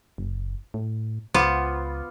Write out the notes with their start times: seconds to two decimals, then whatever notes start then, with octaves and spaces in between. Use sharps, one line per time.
0.18 F#1
0.74 A2
1.34 C#2 B3 F4 C5 D6